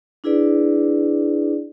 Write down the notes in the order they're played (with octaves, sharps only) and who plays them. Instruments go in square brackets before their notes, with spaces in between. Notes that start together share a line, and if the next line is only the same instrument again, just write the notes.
[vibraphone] D4 E4 G#4 B4 D5